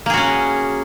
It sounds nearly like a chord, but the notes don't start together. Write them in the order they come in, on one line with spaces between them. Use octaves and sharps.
A#3 G#4 F#4 C#4